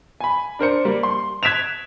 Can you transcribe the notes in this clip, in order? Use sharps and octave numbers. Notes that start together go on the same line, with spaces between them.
G#5 B5
D4 A#4 C5 C#7
G3 A#3
C6
F#6 G#6 B6 D7 E7 F7